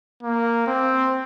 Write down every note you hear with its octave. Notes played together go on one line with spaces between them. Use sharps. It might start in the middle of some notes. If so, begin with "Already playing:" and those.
A#3
C4